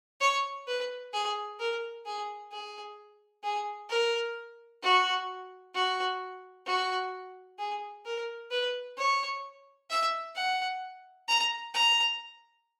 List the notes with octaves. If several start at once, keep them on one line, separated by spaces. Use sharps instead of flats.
C#5
B4
G#4
A#4
G#4
G#4
G#4
A#4
F#4
F#4
F#4
G#4
A#4
B4
C#5
E5
F#5
A#5
A#5